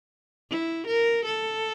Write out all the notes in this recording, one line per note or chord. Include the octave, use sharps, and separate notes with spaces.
E4
A#4
A4